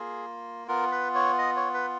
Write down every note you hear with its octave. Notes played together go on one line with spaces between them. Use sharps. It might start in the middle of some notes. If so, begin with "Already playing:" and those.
Already playing: A#3 F4 G#4
B3 F4 A#4
B4
C#5
D#5
C#5
B4